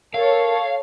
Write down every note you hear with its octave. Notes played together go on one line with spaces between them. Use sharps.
A4 A#4 C#5 F5